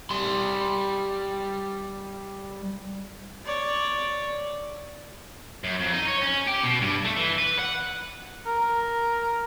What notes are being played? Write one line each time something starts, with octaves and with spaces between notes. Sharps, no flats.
G3 C6
C#5 D5
F#2
F2
D#4
C#5
C#4
G4
B2
G2
A3
E3
B4
F#5
A#4